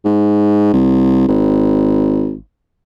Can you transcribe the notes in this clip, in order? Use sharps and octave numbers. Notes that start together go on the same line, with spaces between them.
G#2
C2
G#1